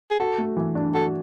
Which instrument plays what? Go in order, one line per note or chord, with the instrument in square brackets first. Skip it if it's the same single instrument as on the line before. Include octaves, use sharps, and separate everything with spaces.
[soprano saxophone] G#4
[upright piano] F#4 [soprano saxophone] A4
[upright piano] A3
E3
D4
[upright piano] F#4 [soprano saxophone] A4